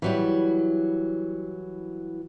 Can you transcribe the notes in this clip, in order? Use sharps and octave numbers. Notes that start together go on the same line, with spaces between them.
E3 F#3 G3